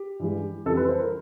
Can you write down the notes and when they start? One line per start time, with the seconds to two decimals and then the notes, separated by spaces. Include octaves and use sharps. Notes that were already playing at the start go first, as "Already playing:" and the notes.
Already playing: G4
0.20 G2 E3 G#3
0.66 F2 C3 E3 G3 A4
0.77 B4
0.88 C5
1.00 A#4